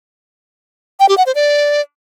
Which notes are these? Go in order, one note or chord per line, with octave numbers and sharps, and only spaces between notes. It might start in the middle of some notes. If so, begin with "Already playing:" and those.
G5
G4
F#5
C5
D5